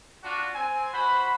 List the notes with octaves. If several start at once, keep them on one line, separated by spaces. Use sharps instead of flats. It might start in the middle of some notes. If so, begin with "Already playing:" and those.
D4 F4 F#4
C4 G#5
F#4 C5 B5